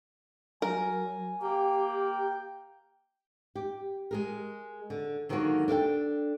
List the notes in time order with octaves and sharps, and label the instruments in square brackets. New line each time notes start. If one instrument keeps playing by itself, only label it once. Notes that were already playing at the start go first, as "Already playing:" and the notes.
[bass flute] F#3 [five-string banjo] A#4 [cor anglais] G#5
[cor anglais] A#3 [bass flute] G4 [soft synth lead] G5
[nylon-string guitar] G4
G#3 G#4 A#4
D3
D3 D#3 F#3 G#3 A#3 F#4
D4 A4 F5 G5